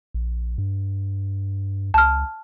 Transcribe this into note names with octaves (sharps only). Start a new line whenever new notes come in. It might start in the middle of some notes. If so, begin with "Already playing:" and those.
A#1
G2
C#2 A5 F6